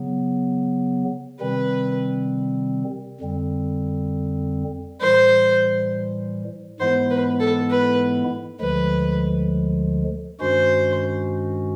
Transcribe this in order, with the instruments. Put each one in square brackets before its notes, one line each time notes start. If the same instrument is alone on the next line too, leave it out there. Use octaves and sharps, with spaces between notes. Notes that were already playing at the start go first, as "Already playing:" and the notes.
Already playing: [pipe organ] C#3 F#3 B3
[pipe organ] C3 D#3 G3 C4 [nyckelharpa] B4
[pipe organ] F2 D3 G3 C4
[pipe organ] A2 E3 G3 [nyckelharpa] C5
[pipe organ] G#2 E3 G#3 B3 E4 [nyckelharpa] C5
[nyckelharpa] B4
A4
B4
[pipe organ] D2 D3 F3 G#3 [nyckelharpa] B4
[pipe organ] G2 D#3 G#3 C#4 F#4 [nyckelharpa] C5